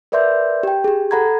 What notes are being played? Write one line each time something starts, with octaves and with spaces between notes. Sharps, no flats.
A#4 B4 D5 E5 C6 G6
G4 G5
G4 G#4
A4 F#5 A#5 B5 G#6